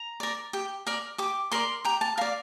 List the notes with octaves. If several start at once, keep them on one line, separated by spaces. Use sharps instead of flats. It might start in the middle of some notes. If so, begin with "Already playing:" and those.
Already playing: A#5
A#4 D5
G4
A#4 D5
G4 D6
A#4 D5 C6
G4 A#5
A5
A#4 D5 F5